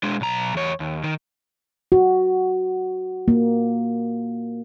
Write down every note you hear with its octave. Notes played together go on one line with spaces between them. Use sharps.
G#3 D4
B1 A#5
E2 C#5
D#2
D#3
F#4
A#3